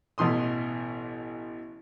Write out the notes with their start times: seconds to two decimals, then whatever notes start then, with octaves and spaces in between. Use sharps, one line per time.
0.18 A1 B2 E3 C6 D#6